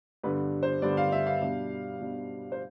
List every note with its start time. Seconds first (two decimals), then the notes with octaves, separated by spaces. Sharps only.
0.23 G2 D3 G3 B3 D4 B4
0.63 C5
0.82 G2 D3 G3 B3 D4 D5
0.97 F5
1.12 E5
1.27 F5
1.42 B2 G3 D4
2.00 B2 G3 D4
2.52 C5